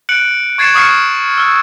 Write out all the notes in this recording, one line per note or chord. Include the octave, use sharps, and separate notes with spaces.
F#6 C#7 D7 F#7
C#6 G#6 A6 C7 C#7 E7
C#6 D#6 F6 C7 C#7
E6 F6